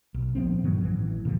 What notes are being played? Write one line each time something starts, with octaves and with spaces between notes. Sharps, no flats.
B1
A#2 F3 B3 C4
G2 D#3 F#3
A1 E3
A#2 D3 E3 F3